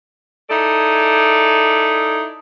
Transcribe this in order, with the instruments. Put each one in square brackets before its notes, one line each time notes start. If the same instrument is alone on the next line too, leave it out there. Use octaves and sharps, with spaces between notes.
[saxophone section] D#4 E4 G#4 A4 D5